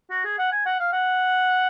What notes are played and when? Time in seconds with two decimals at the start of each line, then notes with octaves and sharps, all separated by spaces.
0.10 F#4
0.25 G#4
0.38 F#5
0.52 G#5
0.65 F#5
0.80 F5
0.93 F#5